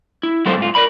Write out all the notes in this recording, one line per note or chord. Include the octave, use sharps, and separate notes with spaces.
E4
F#3 G#3 C4 F4 A4 C5
G#2 F4
A#4 B4 D5 B5